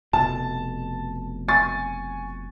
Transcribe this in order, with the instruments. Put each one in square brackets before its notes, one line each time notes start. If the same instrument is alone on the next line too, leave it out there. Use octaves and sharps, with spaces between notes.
[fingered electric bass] F1 B2 [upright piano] A5
[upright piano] G#5 C#6 A6